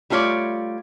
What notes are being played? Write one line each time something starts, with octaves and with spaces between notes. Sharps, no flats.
G3 A3 F4 C#5 D5